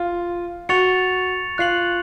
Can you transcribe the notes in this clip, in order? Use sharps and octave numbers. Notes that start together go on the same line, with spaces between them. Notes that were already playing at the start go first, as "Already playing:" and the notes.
Already playing: F4
F#4 C#6 A6 C#7 F7
F4 F#6 C7 F#7